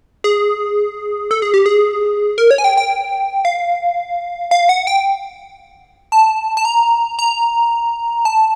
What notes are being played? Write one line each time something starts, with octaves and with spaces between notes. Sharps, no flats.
G#4
A4
G#4
G4
G#4
A#4
C#5
G#5
G5
G5
F5
F5
F#5
G5
A5
A5
A#5
A#5
A5